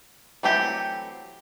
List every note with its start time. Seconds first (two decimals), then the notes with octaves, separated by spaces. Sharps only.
0.43 E3 F#3 A3 C4 G4